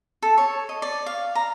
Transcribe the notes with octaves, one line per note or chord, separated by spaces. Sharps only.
A4
C#5
D#5
D5
F5
A#5